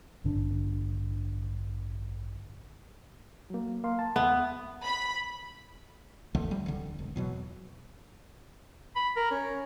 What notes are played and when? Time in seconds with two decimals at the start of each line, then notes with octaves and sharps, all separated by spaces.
0.24 A1 G2 D3 D4
3.50 F#3 A#3
3.84 A#3 F5 C6
3.99 A5
4.16 D#2 B3 E5
4.85 B5
6.35 D#2 D3 F3 A3
6.51 G3
6.66 D1 D3
6.99 E1
7.16 E2 B2 F#3
8.96 B5
9.16 A#4
9.31 C#4